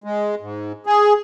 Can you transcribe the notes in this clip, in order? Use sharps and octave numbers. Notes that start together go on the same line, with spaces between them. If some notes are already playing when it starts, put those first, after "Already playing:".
G#3
G#2
G#4